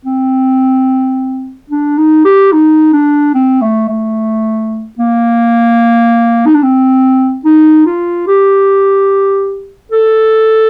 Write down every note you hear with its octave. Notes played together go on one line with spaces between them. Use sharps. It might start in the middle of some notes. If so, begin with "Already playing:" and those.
C4
D4
D#4
G4
D#4
D4
C4
A3
A3
A#3
D#4
D4
C4
D#4
F4
G4
A4